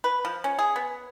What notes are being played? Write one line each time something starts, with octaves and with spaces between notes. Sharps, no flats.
B4
F3
C#4
G#4
B3